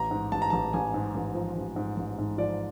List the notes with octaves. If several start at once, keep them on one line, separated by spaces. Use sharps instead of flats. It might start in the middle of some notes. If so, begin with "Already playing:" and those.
Already playing: A1 A#5
G#2
A1 A5
A#5
A5
A1
A1 G#5
G#2
A1
F3
A1
G#2
A1
G#2
F3 D5